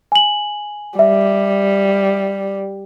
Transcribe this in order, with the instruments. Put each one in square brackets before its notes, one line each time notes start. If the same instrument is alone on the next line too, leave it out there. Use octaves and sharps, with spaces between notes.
[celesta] G#5 F#7
[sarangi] G3 [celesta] E5